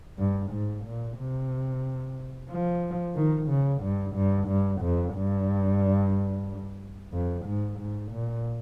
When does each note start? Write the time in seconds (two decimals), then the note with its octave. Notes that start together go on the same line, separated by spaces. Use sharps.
0.19 G2
0.52 G#2
0.85 A#2
1.18 C3
2.50 F3
3.15 D#3
3.49 C#3
3.83 G2
4.15 G2
4.47 G2
4.81 F2
5.15 G2
7.13 F2
7.46 G#2
7.79 G#2
8.11 A#2